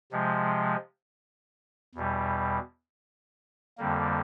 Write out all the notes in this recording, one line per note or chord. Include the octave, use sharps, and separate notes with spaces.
C3 F3 G#3
E2 B2 G3
F2 D3 G3 A#3